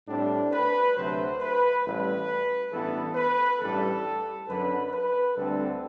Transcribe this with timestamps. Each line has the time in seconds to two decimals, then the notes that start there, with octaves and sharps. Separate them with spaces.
0.08 A2 G3 C4 D4
0.52 B4
0.96 D2 C3 F#3 A3 C5
1.40 B4
1.84 A1 A2 G3 B4
2.72 A1 G2 E3 B3 A4
3.15 B4
3.60 A1 G2 E3 G3 A4
4.47 F#2 D3 F#3 B4
4.92 B4
5.36 D2 D3 G3 C4 A4